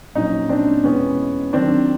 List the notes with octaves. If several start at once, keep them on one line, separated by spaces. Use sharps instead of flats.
A#1 A#2 F#3 C#4 D#4
C4 D4
E2 B2 G#3 B3 C#4
D#2 D#3 F#3 C4 D4